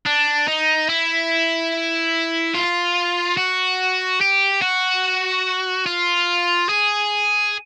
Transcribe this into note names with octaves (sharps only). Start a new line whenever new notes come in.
D4
D#4
E4
F4
F#4
G4
F#4
F4
G#4